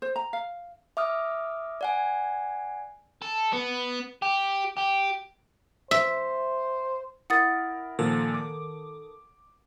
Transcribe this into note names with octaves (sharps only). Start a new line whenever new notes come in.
C5
A#5
F5
E5 D6 D#6 F6
D5 F#5 G#5
A4
B3
G4
G4
C5 E5
E4 A#4 F#5 D#6 A6
A#2 D#3 F3 A#3 A4 A#4
D6